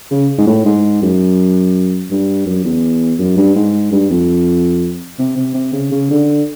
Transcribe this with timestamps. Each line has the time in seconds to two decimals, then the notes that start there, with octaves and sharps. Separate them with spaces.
0.11 C#3
0.38 G#2
0.47 A2
0.65 G#2
1.02 F#2
2.11 G2
2.47 F#2
2.64 E2
3.19 F#2
3.37 G2
3.56 G#2
3.92 G2
4.10 F2
5.19 C3
5.37 C3
5.54 C3
5.73 C#3
5.91 C#3
6.10 D3